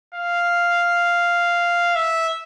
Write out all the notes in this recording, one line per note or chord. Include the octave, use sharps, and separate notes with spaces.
F5
E5